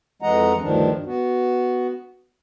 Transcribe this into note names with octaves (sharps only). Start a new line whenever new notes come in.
F2 E3 G#3 D#5 F#5 A#5
D2 G2 D#3 F3 D4
B3 F#4